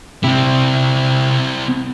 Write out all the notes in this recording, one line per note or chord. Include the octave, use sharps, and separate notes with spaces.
C3 C4 E4